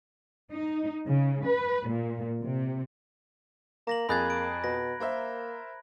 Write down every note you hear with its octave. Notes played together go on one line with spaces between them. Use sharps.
D#4
C#3
B4
A#2
C3
A#3 A#5 A#6 F#7
F2 A#3 G#4 B5 F#6 G#6 A6
D7
B2 A#6
A#3 A#4 C5 E5